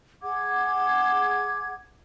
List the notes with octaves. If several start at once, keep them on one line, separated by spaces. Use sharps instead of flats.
G#4 F#5 D6 G#6